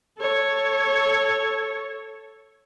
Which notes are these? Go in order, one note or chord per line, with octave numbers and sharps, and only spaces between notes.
A4 C#5